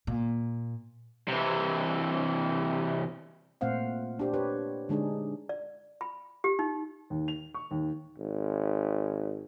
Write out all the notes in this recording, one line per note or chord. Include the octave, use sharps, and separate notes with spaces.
A#2
C3 E3
A#2 A3 C4 C5 F5 F#5
D4 G4 C5
G4 B4 C#5
D3 G#3 D4 D#4 G#4
D5
B5
G4
D#4
D#2
F7
C#6
D#2
G#1